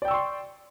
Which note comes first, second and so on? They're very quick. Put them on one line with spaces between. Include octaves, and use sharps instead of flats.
D5 G5 E6 C#6 C6